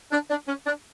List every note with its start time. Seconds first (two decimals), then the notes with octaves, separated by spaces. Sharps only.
0.12 D4
0.30 D4
0.47 C#4
0.66 D4